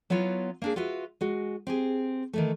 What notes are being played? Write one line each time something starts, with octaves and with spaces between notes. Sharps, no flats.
F#3 B3 E4 F4 C#5
A#3 D4 G#4
F4 F#4 B4 E5
G#3 F#4
C4 G4 G#4
D#3 E3 A3